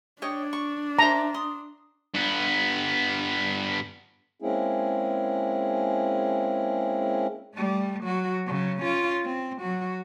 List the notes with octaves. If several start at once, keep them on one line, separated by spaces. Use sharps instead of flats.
D4 C#5 D#5 G5
C#6
C5 E5 A5 A#5
C6 D#6
G2 B3
G#3 A#3 C4 C#4 E4 G#4
G3 A3
F#3 F#4
C#3 F#3
C#4 F4
C4
F#3 F#4